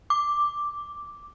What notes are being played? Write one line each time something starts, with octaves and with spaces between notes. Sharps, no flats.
D6